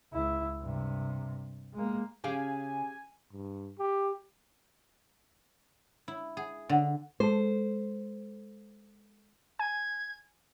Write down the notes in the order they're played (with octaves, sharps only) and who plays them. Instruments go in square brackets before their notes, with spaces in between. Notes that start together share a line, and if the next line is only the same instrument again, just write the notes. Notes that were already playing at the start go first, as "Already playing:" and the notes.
[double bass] C#2 E4
G2 C3
G#3 A#3
[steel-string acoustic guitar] C#3 [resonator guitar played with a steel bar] G4 G#4 F5 [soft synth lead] G#5
[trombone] G2
G4
[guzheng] E4
G#4
D3
[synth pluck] G#3 A4 [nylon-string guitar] C5
[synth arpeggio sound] G#5 [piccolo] G#6